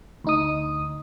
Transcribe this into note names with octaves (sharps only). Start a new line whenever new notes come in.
D2 D#4 D#6